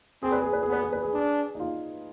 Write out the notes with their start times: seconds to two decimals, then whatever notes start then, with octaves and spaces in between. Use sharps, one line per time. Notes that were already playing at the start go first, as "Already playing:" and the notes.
0.23 C4 G#4
0.32 B4
0.42 G#4
0.53 B4
0.63 G#4
0.69 B3 B4
0.83 G#4
0.93 B4
1.03 G#4
1.14 D4
1.55 D#4
1.60 F4